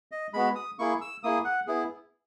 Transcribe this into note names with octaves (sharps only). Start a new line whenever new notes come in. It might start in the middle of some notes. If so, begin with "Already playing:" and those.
D#5
G#3 B3 F#4 B5
D#6
A#3 E4 G#4 C#6
E6
A#3 E4 G#4 D#6
F#5
B3 E4 G#4